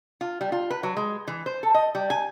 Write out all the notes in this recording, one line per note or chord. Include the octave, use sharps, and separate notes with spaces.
F4
G3
F4
B4
F#3
G#3
E3
C5
A4
D#5
G3
G#5